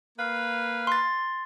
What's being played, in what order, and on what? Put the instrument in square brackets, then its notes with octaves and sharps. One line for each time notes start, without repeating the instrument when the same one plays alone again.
[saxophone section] A#3 B4 F5
[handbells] C6 A6